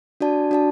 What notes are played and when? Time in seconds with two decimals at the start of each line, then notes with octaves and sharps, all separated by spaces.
0.21 D4 F#4 D5 A5
0.51 D4 F#4 D5 A5